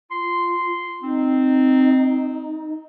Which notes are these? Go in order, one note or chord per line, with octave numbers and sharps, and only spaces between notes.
F4 C6
C4 D#4